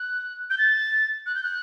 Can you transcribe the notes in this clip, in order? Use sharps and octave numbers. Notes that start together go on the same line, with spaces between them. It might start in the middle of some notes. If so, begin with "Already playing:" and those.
Already playing: F#6
G6
A6
F#6
G6
F#6